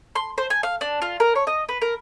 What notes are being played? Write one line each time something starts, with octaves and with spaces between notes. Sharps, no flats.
C6
C5
G#5
F5
D4
F4
A#4
C#5
D#5
B4
A#4